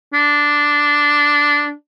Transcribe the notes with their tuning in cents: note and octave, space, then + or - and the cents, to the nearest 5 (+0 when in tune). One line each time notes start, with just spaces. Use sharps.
D4 -5